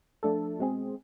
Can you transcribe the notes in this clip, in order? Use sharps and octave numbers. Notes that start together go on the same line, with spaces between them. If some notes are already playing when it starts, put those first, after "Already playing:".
F3 A3 D4 A4
B2 G#3 C4 G#4